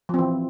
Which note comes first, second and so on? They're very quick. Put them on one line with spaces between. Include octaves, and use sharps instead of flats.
F3 C4 E3